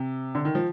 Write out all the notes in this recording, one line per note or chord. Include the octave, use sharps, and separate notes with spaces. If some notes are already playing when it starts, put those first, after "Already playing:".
Already playing: C3
D3
D#3
F3